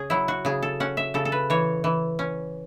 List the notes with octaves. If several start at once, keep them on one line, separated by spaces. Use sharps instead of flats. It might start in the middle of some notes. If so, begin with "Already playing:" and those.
Already playing: C#3 C#4 G#4
F#3 E4
F#4
C#3 G#4
A4
C#4 F#5
E5
C#3 A4
A4
B4
E3 C#5
E3
C#4